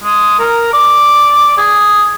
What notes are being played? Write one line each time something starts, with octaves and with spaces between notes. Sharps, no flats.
G#3
A#4
D5
G#4